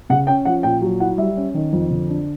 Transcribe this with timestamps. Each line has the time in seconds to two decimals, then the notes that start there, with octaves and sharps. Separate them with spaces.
0.10 C#3 F#5
0.27 C#4 G5
0.45 F3 F#5
0.63 A#2 G5
0.81 F#3
1.00 E4 F#5
1.17 G3 E5
1.37 C#4
1.54 D#3
1.72 F2
1.91 D3
2.09 D4